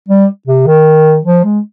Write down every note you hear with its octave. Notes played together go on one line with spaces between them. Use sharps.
G3
C3
D#3
F3
G#3